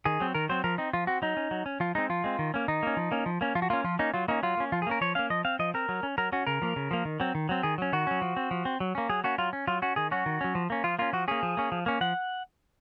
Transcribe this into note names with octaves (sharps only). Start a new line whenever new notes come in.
D#3 G#4
F#3 C4
D#3 A#4
F#3 C4 C5
F3 A#4
C4 D#4
F3 F4
C4 F#4
F#3 D#4
C#4
F#3
C#4
F3 F4
G#3 C4 D#4
F3 F4
G#3 C4
D#3
A#3 C#4
D#3 D#4
A#3 C#4
F3
A#3 C#4
F3
A#3 C#4
F3 F4
F#4
A#3 C#4 F4
F3 F4
A#3 C#4 D#4
F#3 F4
A#3 C#4 D#4
F#3 F4
A#3 C#4
F3 F4
G#4
A#3 C#4 A#4
F3 C#5
A#3 C#4 F5
F3 D#5
C4 F5
F3 D#5
C4 A#4
F#3
C#4
F#3 A#4
C#4 F#4
C#3 A#4
F3 A#3
C#3
F3 A#3
D#3
F#3 C4
D#3
F#3 C4
D#3 G#4
F#3 C#4
D#3 F#4
F#3 C#4
F3
C4
F3
C4
F#3
A#3 C#4
F#3 G#4
A#3 C#4 F#4
F#3 F4
C#4
F#3 F4
C#4 F#4
D#3 G#4
F#3 C#4 F#4
D#3
F#3 C#4
F3
A#3 C#4
F3 F4
A#3 C#4 F4
F3 F#4
A#3 C#4 G#4
F3
A#3 C#4
F3
A#3 C#4
F3 F#5